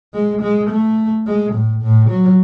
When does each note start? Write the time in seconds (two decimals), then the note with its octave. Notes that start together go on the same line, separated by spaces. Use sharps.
0.14 G#3
0.42 G#3
0.70 A3
1.27 G#3
1.54 A2
1.83 A2
2.10 F#3